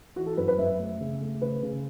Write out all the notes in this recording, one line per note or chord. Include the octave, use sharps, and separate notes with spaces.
E3 F#4
A4
F#2 B4
B4
F#2 E5
A3
C#3
A3
C#3 B4
C#3